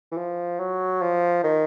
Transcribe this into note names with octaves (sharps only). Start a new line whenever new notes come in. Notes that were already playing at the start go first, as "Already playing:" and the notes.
E3
F3
F#3
F3
D#3